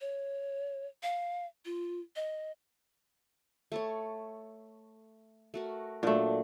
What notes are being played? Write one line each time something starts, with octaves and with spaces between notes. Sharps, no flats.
C#5
F5
F4
D#5
A3 A4 C#5
A3 F#4 A#4
A#2 F#3 A3 D4